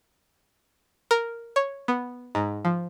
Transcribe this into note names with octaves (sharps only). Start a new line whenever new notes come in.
A#4
C#5
B3
G#2
F3